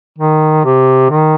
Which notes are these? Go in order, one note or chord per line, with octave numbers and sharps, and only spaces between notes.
D#3
C3
D#3